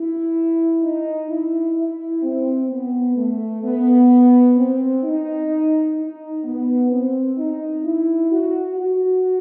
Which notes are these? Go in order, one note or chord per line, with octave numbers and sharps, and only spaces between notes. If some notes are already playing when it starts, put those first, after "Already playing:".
Already playing: E4
D#4
E4
E4
C4
B3
A3
B3
C4
D#4
D#4
B3
C4
D#4
E4
F#4
F#4